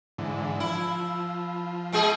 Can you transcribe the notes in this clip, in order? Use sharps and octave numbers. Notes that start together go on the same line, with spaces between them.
G#2 D3 E3
F3 E4
B2 G#3 G#4